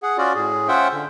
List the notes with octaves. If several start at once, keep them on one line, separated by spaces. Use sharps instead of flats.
G#4 F#5
C#4 F4 F#4 D5
A2 G#4
C#4 F4 C5 E5 F#5 G5
D3